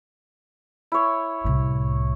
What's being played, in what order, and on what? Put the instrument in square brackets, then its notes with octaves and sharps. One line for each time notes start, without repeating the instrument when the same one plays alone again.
[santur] E4 C#5
[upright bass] C2 A2